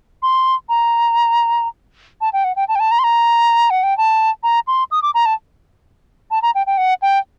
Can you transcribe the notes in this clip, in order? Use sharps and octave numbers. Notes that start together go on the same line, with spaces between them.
C6
A#5
A5
G5
F#5
G5
A5
G5
A5
A#5
C6
A#5
F#5
G5
A5
A#5
C6
D#6
D6
A#5
A5
A5
A#5
G5
G5
F#5
G5